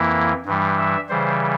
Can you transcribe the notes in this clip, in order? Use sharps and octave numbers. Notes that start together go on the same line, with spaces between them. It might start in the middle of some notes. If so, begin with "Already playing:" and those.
Already playing: F2 E3 A#3 E4
G2 E3 G3
E5
C#3 E3 G3 C5